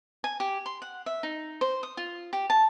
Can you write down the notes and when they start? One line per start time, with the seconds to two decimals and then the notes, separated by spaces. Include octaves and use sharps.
0.24 G#5
0.40 G4
0.66 C6
0.82 F#5
1.06 E5
1.23 D#4
1.61 C5
1.83 D#6
1.97 F4
2.33 G4
2.50 A5